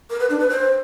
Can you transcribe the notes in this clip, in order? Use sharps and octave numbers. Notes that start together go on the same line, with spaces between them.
A#4
B4
D4
B4
C5